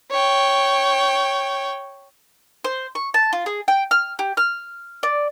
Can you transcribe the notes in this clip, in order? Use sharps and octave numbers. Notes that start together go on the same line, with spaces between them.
C#5 G5
C5
C#6
A5
F4
G#4
G5
F6
G4
F6
D5